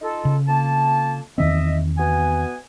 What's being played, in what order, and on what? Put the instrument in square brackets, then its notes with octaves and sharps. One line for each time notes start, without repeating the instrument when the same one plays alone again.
[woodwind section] D#4 F4 A4
[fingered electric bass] C#3
[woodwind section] F2 A#3 A5
[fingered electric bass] E2 D#3 C4 [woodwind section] D#5 E5
[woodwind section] B2 B3 G#5